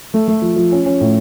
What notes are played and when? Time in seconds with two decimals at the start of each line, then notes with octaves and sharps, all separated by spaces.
0.14 A3
0.28 A3
0.42 F3
0.56 F3
0.72 C#4
0.86 C#4
1.01 A2